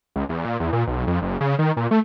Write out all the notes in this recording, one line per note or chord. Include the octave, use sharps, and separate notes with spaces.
C#2
E2
A#2
E2
A#2
B1
F2
F#1
C#3
D#3
A#2
A3